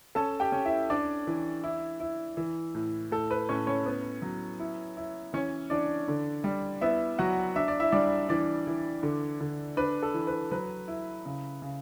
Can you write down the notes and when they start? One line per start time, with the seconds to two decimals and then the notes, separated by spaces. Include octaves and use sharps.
0.15 C#4 A4 A5
0.40 G4 G5
0.52 C#4
0.65 E4 E5
0.90 D4 D5
1.27 E3
1.64 E4
2.00 E4
2.37 E3
2.75 A2
3.11 A2 A4
3.31 B4
3.49 A2 C#4 C#5
3.67 C#4 C#5
3.86 B3
4.22 F#3
4.60 E4
4.97 E4
5.33 E3 C#4 C#5
5.70 E3 D4 D5
6.08 D3
6.44 G3
6.81 B3 E4 E5
7.19 F#3 F#4 F#5
7.56 D4 E5
7.68 D5
7.80 E4 E5
7.92 G3 D4 D5
8.29 E3 D4 D5
8.67 E3
9.03 D3
9.40 D3
9.77 D4 B4
10.03 A4
10.14 E3
10.27 B4
10.51 F#3 B4
10.88 E4
11.26 C#3
11.62 C#3